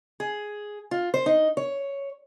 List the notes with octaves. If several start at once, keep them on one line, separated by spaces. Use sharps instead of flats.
G#4
F4
C5
D#4
C#5